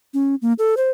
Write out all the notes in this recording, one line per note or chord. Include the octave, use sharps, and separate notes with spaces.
C#4
A#3
A4
C5